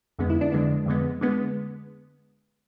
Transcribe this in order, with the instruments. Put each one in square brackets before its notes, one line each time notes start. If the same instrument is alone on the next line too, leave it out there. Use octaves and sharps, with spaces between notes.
[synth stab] F2 D3 G#3 B3
E4
D4
F2 D3 G#3 B3 D4
F2 D3 G#3 B3
D3 G#3 B3